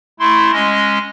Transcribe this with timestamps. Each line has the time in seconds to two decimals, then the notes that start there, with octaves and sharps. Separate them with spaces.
0.20 A3 E4 C6
0.52 G#3 C#4 D#5